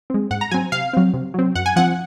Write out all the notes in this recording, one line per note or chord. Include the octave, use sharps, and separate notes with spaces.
G#3 C4
G#2 F#5
A#5
F#3 C4 G#5
C3 F5
F#3 C4
C3
F#3 C4
F#2 F#5
G#5
F3 C4 F#5